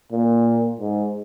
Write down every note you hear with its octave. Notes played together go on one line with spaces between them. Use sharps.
A#2
G#2